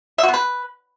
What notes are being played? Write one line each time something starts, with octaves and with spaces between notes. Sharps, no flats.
E5
F#4
B3
B4